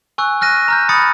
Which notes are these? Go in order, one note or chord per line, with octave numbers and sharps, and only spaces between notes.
G#5 C#6 E6 F#6
F6 F#6 A#6 D#7
A#5 F6 G6
B5 D#6 A6 C#7